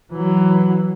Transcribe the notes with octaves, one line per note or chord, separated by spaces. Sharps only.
E3 F#3